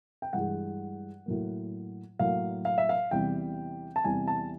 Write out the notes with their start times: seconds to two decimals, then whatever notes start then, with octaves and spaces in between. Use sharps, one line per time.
0.22 G5
0.33 G2 E3 G#3 F#5
1.26 A2 F#3 A#3
2.19 A2 F#3 A#3 F5
2.65 F5
2.78 E5
2.89 F5
3.11 E2 C3 E3 G3 G5
3.96 A5
4.04 E2 C3 E3 G3 G#5
4.28 A5